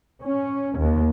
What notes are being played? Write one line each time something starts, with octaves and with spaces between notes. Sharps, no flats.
C#4
D#2